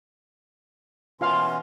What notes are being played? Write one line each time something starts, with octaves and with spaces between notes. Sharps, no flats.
B2 E3 C#4 F4 F5 C6